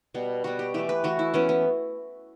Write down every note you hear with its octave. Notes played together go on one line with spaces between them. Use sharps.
B2 G3 B3
B2 G3 B3 F#4
G4
E3 A3 G4
B4
E3 A3 F#4
E4
E3 B3 C#4
B3